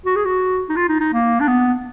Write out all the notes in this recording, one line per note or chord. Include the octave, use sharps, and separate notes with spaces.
F#4
G#4
F#4
D#4
F4
D#4
D#4
A#3
D4
B3